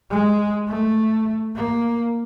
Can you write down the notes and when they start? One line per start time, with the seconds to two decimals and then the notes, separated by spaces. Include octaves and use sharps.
0.11 G#3
0.69 A3
1.56 A#3